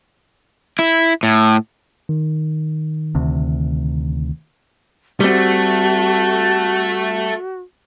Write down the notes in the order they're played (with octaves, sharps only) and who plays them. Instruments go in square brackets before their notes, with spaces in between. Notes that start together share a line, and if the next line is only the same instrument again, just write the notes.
[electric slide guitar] E4
A2
[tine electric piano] D#3
[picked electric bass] D2 C3
[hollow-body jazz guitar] G3 C4 [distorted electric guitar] A3 [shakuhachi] F#4